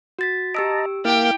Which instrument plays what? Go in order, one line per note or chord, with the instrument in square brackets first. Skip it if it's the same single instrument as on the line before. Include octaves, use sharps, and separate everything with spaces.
[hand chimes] F#4 A6 B6
[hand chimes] G4 E6 D7 [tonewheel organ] D#5 A5 A#5
[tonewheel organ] A#3 F5 [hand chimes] E4 [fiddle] G4 G5